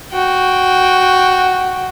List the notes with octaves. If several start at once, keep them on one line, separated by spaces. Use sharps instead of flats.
F#4 G5